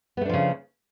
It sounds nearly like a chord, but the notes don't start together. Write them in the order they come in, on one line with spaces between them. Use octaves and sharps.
B3 A3 D4 F3 C#3